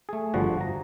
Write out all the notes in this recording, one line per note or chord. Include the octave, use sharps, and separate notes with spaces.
A3 G#4
G1 D3 F3 G3 F#4
A#5